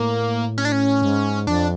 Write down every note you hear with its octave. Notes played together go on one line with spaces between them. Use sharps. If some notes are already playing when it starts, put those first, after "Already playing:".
Already playing: A2 A#3
C#4
D4
C#4
G#2
F2 D4